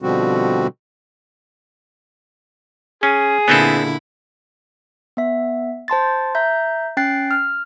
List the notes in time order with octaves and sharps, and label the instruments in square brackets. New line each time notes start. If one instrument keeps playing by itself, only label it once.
[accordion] B2 D3 F3 G3 C4 F#4
[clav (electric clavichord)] C#4 [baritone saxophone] G#4
[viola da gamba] A#2 D3 E4 [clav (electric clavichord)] B3 C4 A4
[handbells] B3 E5
C5 A5 C6 A6
E5 A#5 G6
C#4 G5 F#6 A6 C7
F6